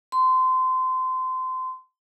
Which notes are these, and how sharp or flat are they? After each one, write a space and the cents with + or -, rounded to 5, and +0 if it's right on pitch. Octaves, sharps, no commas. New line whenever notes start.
C6 -25